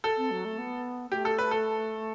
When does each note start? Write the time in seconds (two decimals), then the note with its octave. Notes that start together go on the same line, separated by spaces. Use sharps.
0.04 A4
0.17 C4
0.31 F#3
0.45 A3
0.58 B3
1.12 A3 G4
1.25 A4
1.39 B4
1.51 A4